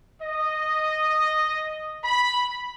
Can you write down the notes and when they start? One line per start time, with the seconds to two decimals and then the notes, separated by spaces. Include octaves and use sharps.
0.21 D#5
2.04 B5